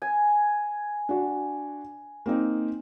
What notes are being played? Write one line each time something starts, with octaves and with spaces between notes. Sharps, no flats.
G#5
D4 F#4
A#3 C4 D#4